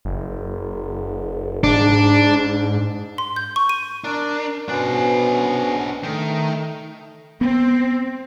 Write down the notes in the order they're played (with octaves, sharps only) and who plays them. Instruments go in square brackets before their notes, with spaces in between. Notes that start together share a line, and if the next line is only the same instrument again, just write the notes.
[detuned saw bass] F#1
[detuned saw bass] G#2 [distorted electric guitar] D4
[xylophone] C6
G6
C#6
D#7
[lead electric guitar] D4 [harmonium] A#4
[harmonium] B2 B3 C#4 [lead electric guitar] D4 C5
[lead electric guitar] D#3 [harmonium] A3
[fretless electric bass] B3 [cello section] C4